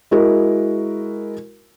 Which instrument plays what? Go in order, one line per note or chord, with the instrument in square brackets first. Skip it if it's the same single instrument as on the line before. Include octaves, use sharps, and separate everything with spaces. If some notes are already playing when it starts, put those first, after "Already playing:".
[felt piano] G#3 E4 F#4 A#4